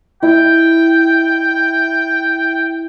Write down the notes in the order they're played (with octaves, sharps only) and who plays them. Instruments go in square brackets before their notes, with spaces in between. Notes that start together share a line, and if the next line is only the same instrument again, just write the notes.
[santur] E4 [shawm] G5